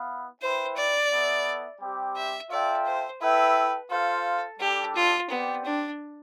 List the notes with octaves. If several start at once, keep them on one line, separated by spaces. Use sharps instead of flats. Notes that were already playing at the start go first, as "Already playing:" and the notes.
Already playing: B3 E4 B4 F5
E4 B4 C5 E5 G5
D5
B3 E4 A4 E5
G3 C4 G4
E5
F4 A4 D5 E5 G5
C5
E4 A4 B4 E5 G5
F4 A4 C5 F5
G3 D4 G4 A4
F4
B3 C4 G4 D5 G5
D4